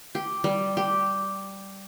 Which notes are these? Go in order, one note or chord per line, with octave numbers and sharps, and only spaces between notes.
G4
G3
G4